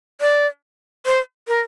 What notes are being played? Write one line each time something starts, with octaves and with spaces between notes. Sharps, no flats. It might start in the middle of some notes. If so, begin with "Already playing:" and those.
D5
C5
A#4